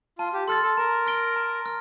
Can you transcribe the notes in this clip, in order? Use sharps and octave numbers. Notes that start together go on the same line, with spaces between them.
F4 A5
G4
A4 C6 F6 A6
A4
A#4 A#5
F6 A#6 D7 G7
A#5
F6